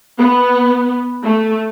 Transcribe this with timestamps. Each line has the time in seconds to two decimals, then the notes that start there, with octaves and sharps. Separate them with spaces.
0.18 B3
1.24 A3